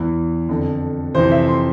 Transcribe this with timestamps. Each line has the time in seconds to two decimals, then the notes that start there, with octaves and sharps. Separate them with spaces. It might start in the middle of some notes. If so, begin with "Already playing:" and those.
Already playing: E2 E3
0.49 F2 D3
1.15 F2 C3 E3 C5
1.31 E5
1.48 C6